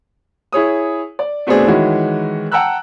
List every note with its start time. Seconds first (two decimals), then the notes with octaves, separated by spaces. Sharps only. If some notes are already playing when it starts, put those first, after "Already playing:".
0.53 E4 G#4 C#5 D#6
1.19 D5
1.47 B2 A3 B3 C4 D4 G#4
1.68 D#3 E3 G#3 E4 F#4 C#5
2.52 F#5 G5 A5 A#5 E6 F#6